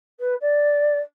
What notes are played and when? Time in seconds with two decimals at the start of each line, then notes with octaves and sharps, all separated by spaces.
0.20 B4
0.41 D5